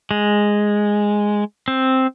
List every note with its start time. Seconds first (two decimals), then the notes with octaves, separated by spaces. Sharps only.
0.11 G#3
1.68 C4